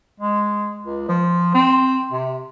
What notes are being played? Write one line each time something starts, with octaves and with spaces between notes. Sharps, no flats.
G#3
C#2
F3
C4
C3